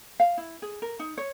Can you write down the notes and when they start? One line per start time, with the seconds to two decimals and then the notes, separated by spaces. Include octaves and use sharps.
0.20 F5
0.38 E4
0.62 G#4
0.82 A#4
0.99 D#4
1.18 C#5